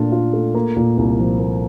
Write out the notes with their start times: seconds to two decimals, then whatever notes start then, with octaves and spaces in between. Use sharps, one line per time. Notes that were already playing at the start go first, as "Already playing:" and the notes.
Already playing: A#2 A3 D4 F4
0.12 F4
0.33 A3
0.55 A#3
0.76 A#2
0.97 C2
1.19 F3
1.40 A#3